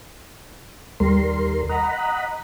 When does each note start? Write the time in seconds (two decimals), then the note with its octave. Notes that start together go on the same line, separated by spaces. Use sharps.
1.00 D#2 G3 A#4 C6
1.69 D#5 F#5 A#5 B5